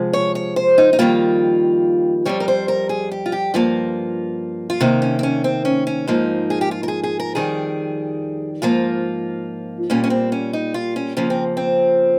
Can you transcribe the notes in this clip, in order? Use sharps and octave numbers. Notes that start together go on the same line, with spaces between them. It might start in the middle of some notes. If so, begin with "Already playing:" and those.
Already playing: C3 F3 G#3
C#5
C#5
C5
D#4
D#4
F2 D#3 G3 A#3 F4
F2 C3 G3 C#5
A#4
C5
A#4
G#4
G4
F4
G4
G2 F3 A#3 F4
F4
C3 D#3 A#3 D#4
C#4
C4
C#4
C4
C#4
C#4
G#2 F3 A#3 D#4
G#4
G4
F4
A#4
G#4
G#4
A#4
F2 D#3 G3 G#4
G#2 F3 A#3 F4
A#2 G3 A#3 C#4
C#4
C4
C#4
D#4
F4
C#4
F2 C#3 F3 A#3 C#4
C4
C4